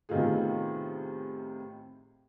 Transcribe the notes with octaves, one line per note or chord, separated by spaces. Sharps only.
A2 C3 D#3 B3 F4 G#4